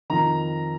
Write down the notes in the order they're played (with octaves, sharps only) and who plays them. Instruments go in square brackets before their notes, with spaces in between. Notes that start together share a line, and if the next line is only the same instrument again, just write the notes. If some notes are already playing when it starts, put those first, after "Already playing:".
[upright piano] F2 D#3 A#5